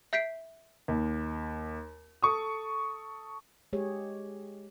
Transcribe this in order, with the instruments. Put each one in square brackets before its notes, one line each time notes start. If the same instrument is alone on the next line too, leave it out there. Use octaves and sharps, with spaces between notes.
[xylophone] E5 G6 B6 C7 D7
[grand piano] D#2
A4 C#6 D#6
[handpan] G#3 G4 G#4 C#5